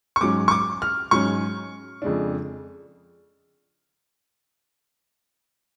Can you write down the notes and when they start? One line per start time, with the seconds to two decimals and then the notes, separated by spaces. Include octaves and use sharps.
0.16 C#6
0.21 G#2 F#3 C#4 D6
0.48 C#6
0.51 D6
0.82 F6
1.11 G#2 F#3 C#4 C#6
2.02 F2 C#3 G#3 D4